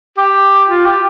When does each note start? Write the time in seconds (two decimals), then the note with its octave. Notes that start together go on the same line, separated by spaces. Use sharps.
0.17 G4
0.69 F4
0.86 G4